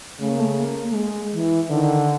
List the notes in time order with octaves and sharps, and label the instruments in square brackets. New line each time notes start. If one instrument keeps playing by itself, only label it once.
[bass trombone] C#3 [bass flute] A3
[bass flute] A#3
A3
A#3
A3
G#3
E3
[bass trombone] D3 [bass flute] D#3